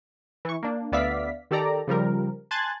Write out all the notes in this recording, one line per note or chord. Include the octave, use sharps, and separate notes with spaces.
E3 C#6
A#3 D4
D2 B3 D5 E5 F5 B6
D#3 G4 A4 D5 A#5
C#3 F3 G3 A#4
G#5 A5 C6 F#6 G#6 A6